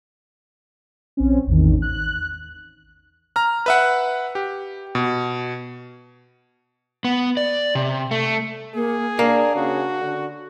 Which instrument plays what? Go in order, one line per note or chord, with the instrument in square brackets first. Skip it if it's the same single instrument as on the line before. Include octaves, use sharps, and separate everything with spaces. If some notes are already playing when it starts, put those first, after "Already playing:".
[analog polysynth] A#1 C4 C#4
A1 E2 D#3
F#6
[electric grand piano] A#5 F6
B4 E5 F#5
G4
B2
[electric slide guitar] B3
D5
C3
A3
[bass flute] A#3 [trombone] G#4
[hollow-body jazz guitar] A#3 [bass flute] D4 [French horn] D5
[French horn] C#3 [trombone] F#4
[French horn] D3